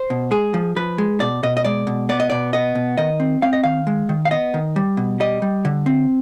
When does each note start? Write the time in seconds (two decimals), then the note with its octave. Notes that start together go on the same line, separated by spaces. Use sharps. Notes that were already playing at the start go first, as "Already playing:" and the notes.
Already playing: C5
0.10 B2
0.31 G#3 G#4
0.54 F3
0.76 F3 B4
0.98 G#3
1.20 B2 D5
1.43 B2 D#5
1.57 D#5
1.64 G#3 D5
1.87 B2
2.09 B3 D5
2.20 D#5
2.30 B2 D5
2.53 B3 D#5
2.75 B2
2.97 D#3 D#5
3.20 C4
3.42 C4 F5
3.53 D#5
3.64 D#3 F5
3.87 G#3
4.09 D#3
4.25 F5
4.31 B3 D#5
4.54 D#3
4.76 G3
4.97 B2
5.20 G3 D#5
5.42 G3
5.65 D3
5.86 C4